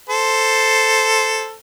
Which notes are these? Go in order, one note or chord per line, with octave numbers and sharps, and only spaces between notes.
A4 C5